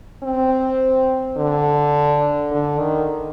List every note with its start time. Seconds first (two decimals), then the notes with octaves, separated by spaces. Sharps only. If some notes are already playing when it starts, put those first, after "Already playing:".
0.23 C4
1.37 D3
2.52 D3
2.79 D#3